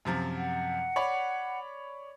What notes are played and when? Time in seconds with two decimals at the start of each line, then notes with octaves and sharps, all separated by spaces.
0.05 F#2 C3 F3
0.37 F#5
0.96 C#5 D5 B5